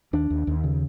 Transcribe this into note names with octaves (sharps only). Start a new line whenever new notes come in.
D#2 D4
D#2
D#2
C#3